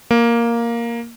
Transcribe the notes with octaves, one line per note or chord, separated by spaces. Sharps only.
A#3